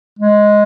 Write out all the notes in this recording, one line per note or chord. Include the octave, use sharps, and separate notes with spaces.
G#3